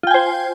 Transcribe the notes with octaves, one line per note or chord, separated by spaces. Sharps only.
F4 C5 G5 G#5